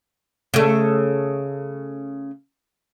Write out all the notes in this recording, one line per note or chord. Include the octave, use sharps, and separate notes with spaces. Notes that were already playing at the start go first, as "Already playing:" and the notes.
C#3 A3